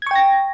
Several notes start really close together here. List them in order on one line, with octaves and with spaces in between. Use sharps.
G#6 C#6 G5 A#6